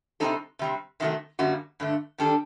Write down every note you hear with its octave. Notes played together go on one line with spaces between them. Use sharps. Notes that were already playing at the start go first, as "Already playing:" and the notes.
C3 G3 C4 D#4 A4
C3 G3 C4
C3 D#3 F#3 A3
F#2 D3 G3 A#3 F#4
G2 D3 A3
D#3 G3 D4 A4